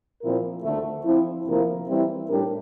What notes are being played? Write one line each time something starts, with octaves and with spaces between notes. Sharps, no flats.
A#2 F3 C4 E4 A#4
D2 D3 A3
F3 C4 E4
D2 C3 F3 A#3 E4
E3 G3 C4 E4
A2 G3 D4 G4 A#4